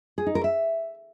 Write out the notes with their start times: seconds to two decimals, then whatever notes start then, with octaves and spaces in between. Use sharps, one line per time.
0.18 G#4
0.26 D#4
0.35 A#4
0.44 E5